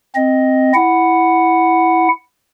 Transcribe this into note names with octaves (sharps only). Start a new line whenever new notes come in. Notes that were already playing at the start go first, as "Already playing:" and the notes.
C4 D#5
E4 F#5